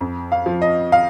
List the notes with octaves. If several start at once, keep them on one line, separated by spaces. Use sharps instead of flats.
F2
F5
F3
D#5
F5